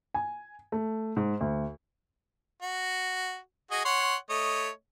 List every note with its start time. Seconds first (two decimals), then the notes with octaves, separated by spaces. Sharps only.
0.14 G#5
0.72 A3
1.16 G#2
1.41 D2
2.62 F#4
3.71 F#4 G#4 D#5
3.85 C#5 F#5 C6
4.30 A3 C#5 D#5